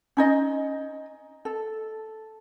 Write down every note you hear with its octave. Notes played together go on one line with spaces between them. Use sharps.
C#4 D#4 D#5
A4